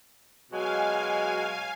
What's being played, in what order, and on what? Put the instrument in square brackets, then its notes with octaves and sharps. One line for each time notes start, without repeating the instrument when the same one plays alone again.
[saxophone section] B2 F#3 G#3 [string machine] F5 G#5